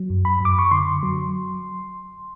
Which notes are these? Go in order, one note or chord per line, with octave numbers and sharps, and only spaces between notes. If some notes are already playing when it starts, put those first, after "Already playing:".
Already playing: F#3
F#2
B5
F#2 D6
C#6
D3 C6
F#3